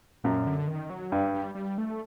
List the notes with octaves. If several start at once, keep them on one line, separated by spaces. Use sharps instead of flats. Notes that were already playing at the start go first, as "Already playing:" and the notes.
F#2 A#2
D3
D#3
F#3
G2 G3
G3
G3
A3